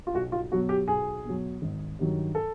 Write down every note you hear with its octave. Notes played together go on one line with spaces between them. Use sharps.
F4
B1 F#4
F4
B2 F#3 F#4
G4
B1 G#4
B2 F#3
G#1
G2 D#3 F#3
A4